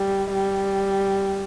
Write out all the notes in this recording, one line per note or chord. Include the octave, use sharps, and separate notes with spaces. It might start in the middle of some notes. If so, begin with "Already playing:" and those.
Already playing: G3
G3